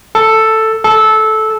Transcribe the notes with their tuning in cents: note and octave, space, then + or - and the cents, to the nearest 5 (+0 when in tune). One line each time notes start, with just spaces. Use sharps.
A4 +5
A4 -15